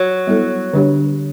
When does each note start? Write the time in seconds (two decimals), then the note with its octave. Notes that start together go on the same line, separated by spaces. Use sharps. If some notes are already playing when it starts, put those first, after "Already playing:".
Already playing: F#3
0.27 G3 B3 E4 A4
0.73 D3 G3 D4 G4 C#5